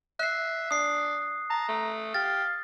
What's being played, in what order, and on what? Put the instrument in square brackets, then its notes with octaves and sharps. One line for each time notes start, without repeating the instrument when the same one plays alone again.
[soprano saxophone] E5 [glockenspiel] F#6 C7
[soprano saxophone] D4 [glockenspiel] D#6 C7
[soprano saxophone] A5 [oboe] A#5
[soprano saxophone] A3
[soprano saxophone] G4 [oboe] F5 [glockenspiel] A6